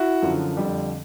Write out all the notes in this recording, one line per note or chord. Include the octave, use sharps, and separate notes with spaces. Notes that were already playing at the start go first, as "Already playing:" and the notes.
Already playing: E4 F#4
F#2 D3 F3
F2 D3 G3